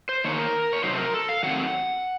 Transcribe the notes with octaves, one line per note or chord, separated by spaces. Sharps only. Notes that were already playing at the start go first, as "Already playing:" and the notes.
C5
D#3 A#3 D#4 C#5
A#4
C#5
C3 F#3 C4 D#4 C5
A4
A#4
A4
F5
D#3 F#3 A3 C4 F#5